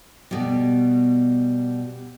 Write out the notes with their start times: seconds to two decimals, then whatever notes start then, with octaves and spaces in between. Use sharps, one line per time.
0.31 B2 G3